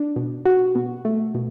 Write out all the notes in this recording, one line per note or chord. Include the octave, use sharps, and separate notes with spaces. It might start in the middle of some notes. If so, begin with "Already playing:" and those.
Already playing: D4
B2
F#4
B2
A3
B2